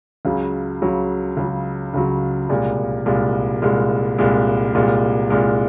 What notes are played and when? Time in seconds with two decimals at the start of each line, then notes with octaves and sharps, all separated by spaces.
0.25 C#2 C#3 F#3
0.82 C#2 C#3 F#3
1.37 C#2 C#3 F#3
1.94 C#2 C#3 F#3
2.49 C2 A#2 G#3
3.06 C2 A#2 G#3
3.62 C2 A#2 G#3
4.18 C2 A#2 G#3
4.75 C2 A#2 G#3
5.30 C2 A#2 G#3